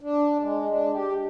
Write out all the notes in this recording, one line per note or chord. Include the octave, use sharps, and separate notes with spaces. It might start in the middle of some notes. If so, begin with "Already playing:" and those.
D4
G#3
D4
G4